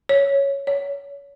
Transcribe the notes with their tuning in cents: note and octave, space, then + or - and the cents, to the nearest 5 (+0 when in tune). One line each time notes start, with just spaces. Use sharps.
C#5 +0
C#5 +25